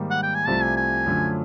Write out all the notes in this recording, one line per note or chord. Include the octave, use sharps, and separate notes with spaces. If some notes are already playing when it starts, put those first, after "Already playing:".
Already playing: G#2 D#3 G3 A#3
F#5
G5
G#5
C2 C3 F3 A3 C4 A5
G#5
G#5
F#2 D3 F3 A3 C#4